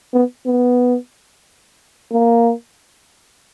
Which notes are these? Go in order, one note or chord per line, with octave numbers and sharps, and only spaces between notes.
B3
B3
A#3